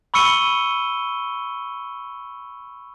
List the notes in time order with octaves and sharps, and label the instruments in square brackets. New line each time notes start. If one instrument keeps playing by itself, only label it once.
[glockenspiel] B5 C#6 E6 C#7 D#7 G7